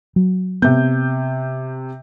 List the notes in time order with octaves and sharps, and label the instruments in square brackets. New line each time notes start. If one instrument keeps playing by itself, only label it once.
[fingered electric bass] F#3
[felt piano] C3 G6 [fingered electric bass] B3